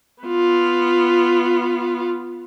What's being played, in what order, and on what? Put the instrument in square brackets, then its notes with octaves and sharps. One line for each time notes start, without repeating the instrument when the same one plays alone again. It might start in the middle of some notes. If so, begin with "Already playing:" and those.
[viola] B3 F4